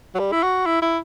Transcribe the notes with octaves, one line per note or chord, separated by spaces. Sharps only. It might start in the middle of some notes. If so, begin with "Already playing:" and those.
F#3
G3
E4
F#4
E4
E4